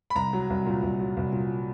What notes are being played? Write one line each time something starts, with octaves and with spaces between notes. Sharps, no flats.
B5
C2 A#5
F#3
C2
A#2
C2
F#3
C2
A#2